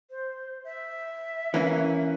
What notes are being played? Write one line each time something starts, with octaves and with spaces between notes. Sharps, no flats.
C5
E5
E3 A#3 C#4